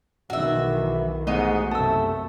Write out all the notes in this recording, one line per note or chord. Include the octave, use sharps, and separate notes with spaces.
B1 D#3 E3 F#4 E5
G#2 A3 B3 F#4 G4 D#5 F#5
F#2 C3 A3 A5 E6